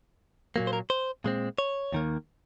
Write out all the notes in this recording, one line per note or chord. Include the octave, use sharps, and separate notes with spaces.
A#2 F#3 A#3
C5
A#4
C5
A#2 G#3 C4
C#5
D#2 D#3 A#3